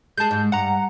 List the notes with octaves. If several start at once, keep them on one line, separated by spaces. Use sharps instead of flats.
G#3 G#4 A5 G6
G#2 G#3
G2 F#5 A#5